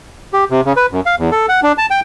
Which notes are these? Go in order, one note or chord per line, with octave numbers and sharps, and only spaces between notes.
G4
C3
C#3
B4
F#2
F5
E2
A4
F#5
D4
A5
G5